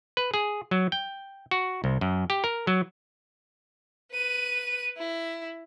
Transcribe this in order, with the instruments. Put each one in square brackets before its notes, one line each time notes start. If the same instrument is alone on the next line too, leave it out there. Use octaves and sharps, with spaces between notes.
[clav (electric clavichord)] B4
G#4
F#3
G5
F#4
C2
F#2
G4
A#4
F#3
[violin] B4 D#7
E4